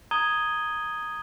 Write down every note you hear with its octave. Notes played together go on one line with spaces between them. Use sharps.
A#5 D#6 G#6 D#7 G7